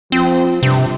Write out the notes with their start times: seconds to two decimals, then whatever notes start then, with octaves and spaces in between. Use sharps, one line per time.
0.12 F3 C4
0.63 G2 C3